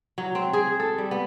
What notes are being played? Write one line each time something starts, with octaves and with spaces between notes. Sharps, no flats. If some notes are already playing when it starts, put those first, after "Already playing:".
F#3
C4
G#4
A4
G3
B3